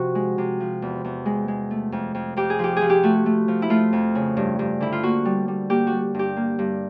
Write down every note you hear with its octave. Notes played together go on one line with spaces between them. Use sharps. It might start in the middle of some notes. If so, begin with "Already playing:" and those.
Already playing: C3 F3 F#4
G#3
C3
F3
E2
E2
G#3
G#3
A3
F2
F2
F2 G4
G#4
F3 G4
F3 G#4
G4
A3 F#4
A3
F3
E4
A3 F4
F2
C#3
G2
G2
D3 E4
F4
A#3 F#4
G3
G3
A#3 G4
F#4
G3
G2 G4
A#3
G2